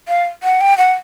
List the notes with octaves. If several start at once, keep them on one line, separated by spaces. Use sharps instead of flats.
F5
F#5
G5
F#5